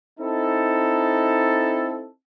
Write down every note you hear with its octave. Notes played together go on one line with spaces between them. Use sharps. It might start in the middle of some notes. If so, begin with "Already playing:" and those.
C4 D#4 E4 A4